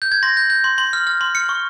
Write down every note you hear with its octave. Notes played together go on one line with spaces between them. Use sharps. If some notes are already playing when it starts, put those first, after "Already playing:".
G6
G#6
C6 A#6
G6
G6
C6
C6
F6
F6
C6
F6 C#7
C#6